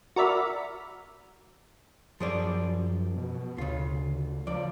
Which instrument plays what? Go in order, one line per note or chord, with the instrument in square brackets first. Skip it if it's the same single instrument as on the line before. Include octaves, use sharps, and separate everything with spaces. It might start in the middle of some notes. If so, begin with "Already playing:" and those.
[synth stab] F#4 A#4 D5 E5 B5 F6
[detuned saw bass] F#2 [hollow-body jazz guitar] F3 G#4 D5
[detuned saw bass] B2
[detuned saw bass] D2 [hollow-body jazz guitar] C#3 F4
[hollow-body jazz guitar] C#2 D5 [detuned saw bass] F3